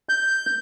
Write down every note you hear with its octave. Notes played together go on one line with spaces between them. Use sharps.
G6